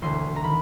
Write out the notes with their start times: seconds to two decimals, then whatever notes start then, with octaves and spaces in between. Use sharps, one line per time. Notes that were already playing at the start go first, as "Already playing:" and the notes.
0.02 E1 D2 D3 C6
0.36 A#5
0.44 D#3 B5